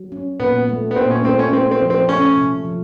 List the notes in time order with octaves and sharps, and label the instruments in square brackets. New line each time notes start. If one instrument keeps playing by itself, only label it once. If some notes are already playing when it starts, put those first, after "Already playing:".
Already playing: [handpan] F#3
C#4
[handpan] A#2 [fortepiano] B3
[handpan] A3
[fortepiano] B3
[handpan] A#2 [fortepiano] C4
[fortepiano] C#4
[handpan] A3 [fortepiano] C4
[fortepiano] C#4
[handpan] A3 [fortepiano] C4
[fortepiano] C4
[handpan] F3
[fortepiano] C4
[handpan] A3 [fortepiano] C#4
[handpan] C3
F3